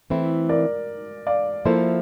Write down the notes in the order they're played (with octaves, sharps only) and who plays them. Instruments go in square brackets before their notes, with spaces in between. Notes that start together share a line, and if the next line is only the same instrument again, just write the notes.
[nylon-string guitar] E3 A3 C4 E4
[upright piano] A#4 D5
D5 F5
[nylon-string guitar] F3 A#3 E4 A4 [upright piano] C5 E5